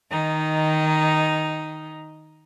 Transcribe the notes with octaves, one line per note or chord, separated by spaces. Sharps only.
D#3 D#4